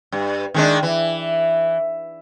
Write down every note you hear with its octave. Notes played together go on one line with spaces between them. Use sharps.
G2
D#3 G#3 D4
E3